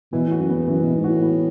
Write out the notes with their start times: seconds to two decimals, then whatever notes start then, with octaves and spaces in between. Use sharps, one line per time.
0.12 B2 E3
0.27 A2 F#4
0.40 F#2
0.50 E2 B3
0.67 F#2 E3
0.82 B2 E3
0.96 G#2
1.04 F#4
1.10 A2
1.23 B3